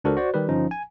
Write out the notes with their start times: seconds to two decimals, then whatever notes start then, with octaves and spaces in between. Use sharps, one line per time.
0.04 C#2 D4 F#4 A4 A#4 C5
0.17 F#4 C5 D5
0.34 D#3 G3 G4 B4
0.49 G1 F3 C#4 D#4
0.71 G#5